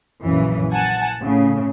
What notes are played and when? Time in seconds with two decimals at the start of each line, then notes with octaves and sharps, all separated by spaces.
0.22 A#1 F#2 C#3 E3
0.72 F#5 G#5 A5
1.22 A2 C#3